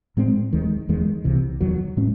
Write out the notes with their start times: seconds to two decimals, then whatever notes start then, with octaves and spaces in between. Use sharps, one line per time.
0.17 A2 G#3 C4
0.53 D#2 D#3 G#3
0.89 E2 D#3 G#3
1.24 C2 C3 E3
1.61 E2 D#3 F#3
1.97 A2 G#3 C#4